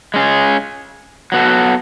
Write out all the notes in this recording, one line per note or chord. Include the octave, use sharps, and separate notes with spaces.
G#3 C#4 G#4
F#3 B3 F#4 A4